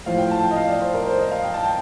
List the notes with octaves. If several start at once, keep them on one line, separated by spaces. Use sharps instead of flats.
A2 F3 F5
G5
A5
G5
D#5
F5
D5
C5
A#4
C5
D#5
F5
G5
A5
G5